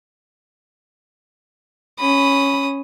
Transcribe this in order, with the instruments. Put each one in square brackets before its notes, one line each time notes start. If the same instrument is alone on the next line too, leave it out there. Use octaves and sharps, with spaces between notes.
[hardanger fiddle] C#4 D#6 [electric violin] B5